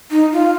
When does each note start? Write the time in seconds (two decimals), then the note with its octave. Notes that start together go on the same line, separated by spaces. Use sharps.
0.11 D#4
0.33 F4